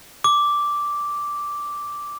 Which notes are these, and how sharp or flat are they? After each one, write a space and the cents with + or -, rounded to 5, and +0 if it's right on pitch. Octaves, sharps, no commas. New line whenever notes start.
D6 -5